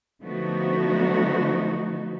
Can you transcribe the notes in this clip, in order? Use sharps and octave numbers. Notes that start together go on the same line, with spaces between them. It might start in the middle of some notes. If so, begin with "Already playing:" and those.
D3 F3 A3 B3 D#4 F#4